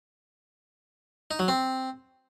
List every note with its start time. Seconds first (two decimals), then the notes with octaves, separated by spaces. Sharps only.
1.31 D#4
1.39 F#3
1.48 C4